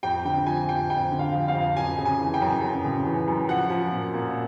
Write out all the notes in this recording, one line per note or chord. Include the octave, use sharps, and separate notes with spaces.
F2 G5
D3 G5
F3 G#5
F2 G5
F2 G5
D3
F5
F3
F5
F2
F#2 G#5
C#3
G#5
E3
G5
F#2
F#2
C#3
E3
F#2
F3 F#5
F3
A#2
A#2